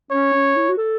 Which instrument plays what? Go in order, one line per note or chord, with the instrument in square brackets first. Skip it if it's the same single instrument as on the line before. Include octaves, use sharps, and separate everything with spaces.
[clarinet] C#4 [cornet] C#5
[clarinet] C#4
E4
F#4
A4